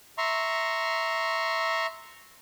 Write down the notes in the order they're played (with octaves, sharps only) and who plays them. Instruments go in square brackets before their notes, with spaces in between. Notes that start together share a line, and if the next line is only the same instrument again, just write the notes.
[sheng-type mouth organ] E5 A#5 C6 C#6